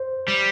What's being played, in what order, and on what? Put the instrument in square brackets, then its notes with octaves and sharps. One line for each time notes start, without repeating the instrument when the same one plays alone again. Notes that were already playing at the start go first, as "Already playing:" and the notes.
Already playing: [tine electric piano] C5
[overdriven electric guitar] G3